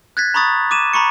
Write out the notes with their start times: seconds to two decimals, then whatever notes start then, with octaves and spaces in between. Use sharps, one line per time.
0.17 F#6 G#6 A6 B6
0.34 A#5 B5 C#6 D#6 A6
0.71 D6 D#7 E7
0.93 A#5 B5 C#6 C#7